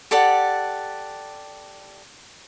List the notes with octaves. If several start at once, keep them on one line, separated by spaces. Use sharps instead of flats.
G4 A4 D5 F#5